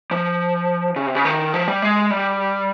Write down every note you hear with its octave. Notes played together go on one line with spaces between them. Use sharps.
F3
C#3
C3
C#3
D#3
F3
G3
G#3
G3